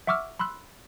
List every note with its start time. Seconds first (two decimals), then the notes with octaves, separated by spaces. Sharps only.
0.07 E5 F#5 C#6 D6 E6 F6
0.39 B5 C6 E6 F#6